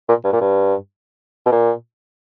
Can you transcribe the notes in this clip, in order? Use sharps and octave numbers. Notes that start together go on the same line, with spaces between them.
A#2
G2
A#2
G2
B2
A#2